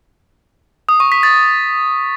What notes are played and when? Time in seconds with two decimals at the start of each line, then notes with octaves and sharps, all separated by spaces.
0.89 D#6
1.00 C#6
1.12 B6
1.23 A6